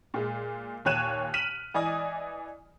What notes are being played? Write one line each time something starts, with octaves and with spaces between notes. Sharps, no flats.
A#2 G#3
D#2 A#2 C#5 F#6 D#7 E7
F6 B6 D#7 E7 F#7
E3 D5 D#5 G#5 D#6